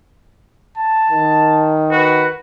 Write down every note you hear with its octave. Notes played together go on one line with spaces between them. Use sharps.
A5
D#3
F#4 B4